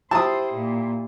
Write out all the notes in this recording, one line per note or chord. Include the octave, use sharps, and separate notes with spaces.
E4 G4 C5 A5 D#6
A#2